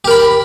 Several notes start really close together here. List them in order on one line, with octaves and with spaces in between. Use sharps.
G4 A#4 B5